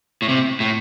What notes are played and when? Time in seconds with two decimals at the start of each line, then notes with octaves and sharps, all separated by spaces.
0.22 A2
0.29 C3
0.60 A2